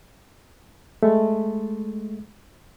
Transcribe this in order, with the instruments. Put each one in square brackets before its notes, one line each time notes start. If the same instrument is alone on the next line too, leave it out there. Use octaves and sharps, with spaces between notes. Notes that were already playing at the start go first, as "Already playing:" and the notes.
[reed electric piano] G#3 A3